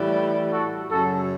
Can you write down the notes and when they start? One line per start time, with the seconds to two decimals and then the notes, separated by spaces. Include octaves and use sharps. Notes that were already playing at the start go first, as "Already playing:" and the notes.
Already playing: A2 E3 G3
0.52 F#4 A4
0.91 F#2 C#3 F#3 F#4 A4